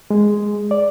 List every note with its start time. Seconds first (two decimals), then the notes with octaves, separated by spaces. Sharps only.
0.11 G#3
0.71 D5